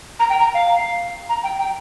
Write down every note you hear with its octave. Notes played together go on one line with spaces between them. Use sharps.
A#5
G5
A#5
F5
A#5
G5
G5